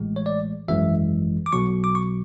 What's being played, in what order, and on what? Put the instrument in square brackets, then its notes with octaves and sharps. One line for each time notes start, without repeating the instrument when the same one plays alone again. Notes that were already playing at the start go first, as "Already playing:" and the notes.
Already playing: [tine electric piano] A1 A2 E3 G#3
C#5
D5
G#1 F#2 E3 G#3 E5
D6
B1 B2 F#3 C#6
D6
C#6